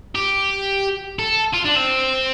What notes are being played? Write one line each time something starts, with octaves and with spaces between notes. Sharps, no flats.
G4
A4
F4
D4
C4